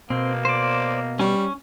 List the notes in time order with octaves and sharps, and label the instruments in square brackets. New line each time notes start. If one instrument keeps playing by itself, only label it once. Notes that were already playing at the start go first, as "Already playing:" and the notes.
[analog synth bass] B2 [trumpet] A#3 [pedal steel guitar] C4
[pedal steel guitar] C5 D5
[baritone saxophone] G3 [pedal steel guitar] C#4 C#6